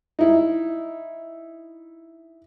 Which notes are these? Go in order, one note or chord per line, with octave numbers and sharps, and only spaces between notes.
D#4 E4